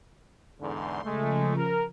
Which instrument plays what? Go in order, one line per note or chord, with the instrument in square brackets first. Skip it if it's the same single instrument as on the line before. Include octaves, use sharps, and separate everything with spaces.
[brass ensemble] E2 G#2 D3 [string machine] C6
[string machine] C#3 F3 [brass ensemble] G#3 A3
[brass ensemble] A#4